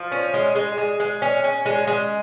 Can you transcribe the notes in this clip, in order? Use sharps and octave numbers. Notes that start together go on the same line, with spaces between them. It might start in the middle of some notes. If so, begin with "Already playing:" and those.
Already playing: F3
C#4
G#3
G#3
G#3
G#3
C#4
C#4
G#3
G#3